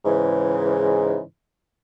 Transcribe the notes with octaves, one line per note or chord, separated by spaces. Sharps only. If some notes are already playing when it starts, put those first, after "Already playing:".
G#2 C#3 E3